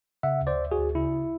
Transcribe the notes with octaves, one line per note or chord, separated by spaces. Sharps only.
C#3 E5 F#5
D2
C5 D5
D2
F#4 G#4
D2
C#3 E4